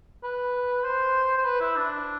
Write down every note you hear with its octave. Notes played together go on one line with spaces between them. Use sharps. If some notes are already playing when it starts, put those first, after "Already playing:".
B4
C5
C5
B4
E4
D4